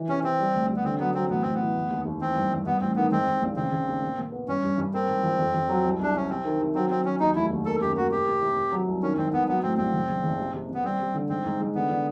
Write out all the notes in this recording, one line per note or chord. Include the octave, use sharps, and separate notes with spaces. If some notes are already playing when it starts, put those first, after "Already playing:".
Already playing: E3
C3 C#4
C3 C4
G3
D2
G3
B3
D3 C4
F#3 B3
F#3 C4
A1 B3
A1 C4
B3
E3
F1
D#2
D#2
E3 C4
G2
G2
G2 B3
A1 C4
D#3 B3
G#2 C4
G#2
A#1
C#3 C4
C#3
D#2
A#2
A#2
B3
G2 C#4
G2
G2
A#3 C4
G#2
F3
F2
F2
F#3
C2
C2 D4
C3 C#4
C3 C4
D#3
C3
F#3 C4
F#3 C4
F#3 C#4
D#2 D#4
F1 E4
D#2
A#3 A4
F#2 G4
A#3 F#4
C3 G4
C3
C3
C3
F#3
C2
D#3 C#4
G#1 C4
G#1 B3
F#3 B3
A2 C4
A#1 C4
F#1
F#1
F#1
C3
C3
C3 B3
G3 C4
G3
D3
G#2 C4
G#2
G#3
D3 B3
D3